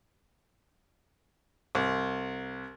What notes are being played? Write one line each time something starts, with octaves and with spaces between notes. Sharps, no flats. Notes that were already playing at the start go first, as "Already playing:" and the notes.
C2